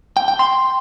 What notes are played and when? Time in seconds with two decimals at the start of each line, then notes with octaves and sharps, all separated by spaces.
0.17 G5
0.28 G5
0.39 C6